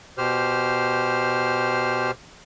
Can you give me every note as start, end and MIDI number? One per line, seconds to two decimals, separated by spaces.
0.18 2.11 47
0.18 2.11 67
0.18 2.11 72
0.18 2.11 89